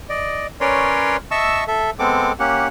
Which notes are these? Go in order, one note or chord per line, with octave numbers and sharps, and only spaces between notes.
D5 D#5
C#4 A#4 B4 C#5 D5 C6
D#5 E5 A5 C#6 E6
A4 E5
G#3 B3 C4 A4 D6
A#3 C#4 G4 F#5